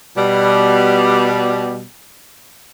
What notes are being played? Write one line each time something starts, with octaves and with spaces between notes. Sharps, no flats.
B2 G3